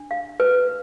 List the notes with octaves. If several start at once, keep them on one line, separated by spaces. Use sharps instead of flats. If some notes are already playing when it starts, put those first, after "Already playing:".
Already playing: D4
F5
B4